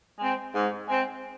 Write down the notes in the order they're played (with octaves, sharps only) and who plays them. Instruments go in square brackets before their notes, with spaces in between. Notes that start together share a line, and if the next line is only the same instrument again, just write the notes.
[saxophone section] G#3 C4
G#2
G#3 C4